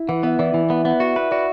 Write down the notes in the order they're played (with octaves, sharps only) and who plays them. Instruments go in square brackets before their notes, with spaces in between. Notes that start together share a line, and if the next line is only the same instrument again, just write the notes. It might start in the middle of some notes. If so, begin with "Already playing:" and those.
Already playing: [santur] E4
[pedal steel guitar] E3 [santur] F#5
[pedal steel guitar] B3 [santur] E5
[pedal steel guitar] E3 [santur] D5
[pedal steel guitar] E3
[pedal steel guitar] B3 [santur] E5
[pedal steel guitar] B3 [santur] F#5
[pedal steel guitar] F#4 [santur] E5
[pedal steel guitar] B4 [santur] E5
[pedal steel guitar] F#4 [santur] D5